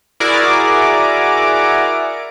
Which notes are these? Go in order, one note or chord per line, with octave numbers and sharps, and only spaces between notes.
E4 F#4 G#4 A#4 D5 D6